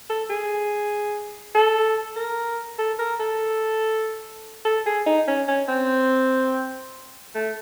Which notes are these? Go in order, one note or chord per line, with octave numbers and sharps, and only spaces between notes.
A4
G#4
A4
A#4
A4
A#4
A4
A4
G#4
D#4
C#4
C#4
C4
A3